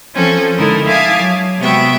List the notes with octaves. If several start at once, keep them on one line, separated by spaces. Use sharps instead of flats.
F3 C4 C#4 A4
D3 G#3 D#4 E4 A#4
E5 F5 G#5 A5 D6 D#6
F#3
C3 G#3 B3 F#4 E5 G5